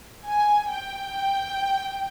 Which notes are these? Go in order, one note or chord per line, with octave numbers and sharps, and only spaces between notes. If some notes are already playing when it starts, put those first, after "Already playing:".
G#5
G5